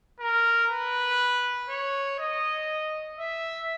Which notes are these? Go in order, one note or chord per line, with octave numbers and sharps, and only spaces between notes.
A#4
B4
C#5
D#5
E5